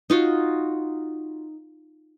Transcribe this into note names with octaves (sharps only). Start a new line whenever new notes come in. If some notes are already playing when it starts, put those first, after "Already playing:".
D#4 F4 F#4